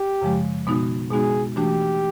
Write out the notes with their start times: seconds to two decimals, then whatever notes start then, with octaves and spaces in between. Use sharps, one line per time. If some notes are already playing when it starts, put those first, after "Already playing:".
Already playing: G4
0.21 F#2 C#3 F3 G#3
0.67 B2 G#3 B3 D#4 F#4
1.11 B2 G#3 B3 D#4 F#4 G#4
1.56 E3 A3 D4 F#4 G4